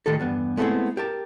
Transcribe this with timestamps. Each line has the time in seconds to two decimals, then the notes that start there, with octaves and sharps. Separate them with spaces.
0.06 A2 D#3 G4 A4
0.20 E2 G2 B3
0.57 G#3 A3 B3 C4 E4 G#4
0.97 G4 A#4 A5